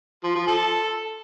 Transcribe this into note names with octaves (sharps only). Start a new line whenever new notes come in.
F3
F3
A4